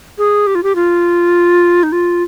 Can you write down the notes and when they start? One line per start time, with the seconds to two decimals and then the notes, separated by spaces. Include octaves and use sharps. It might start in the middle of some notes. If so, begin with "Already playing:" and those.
0.18 G#4
0.47 G4
0.55 F4
0.63 G4
0.75 F4
1.83 D#4
1.92 F4